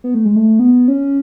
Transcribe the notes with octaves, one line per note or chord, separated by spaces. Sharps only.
B3
A3
G#3
A3
B3
C#4